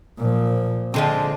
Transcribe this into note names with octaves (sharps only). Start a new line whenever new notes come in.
A#2 F3
D3 F3 G#3 C4